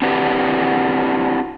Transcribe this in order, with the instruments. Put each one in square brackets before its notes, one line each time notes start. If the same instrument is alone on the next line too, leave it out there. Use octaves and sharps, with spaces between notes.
[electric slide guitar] C4 D4 E4 F#4 G4 B4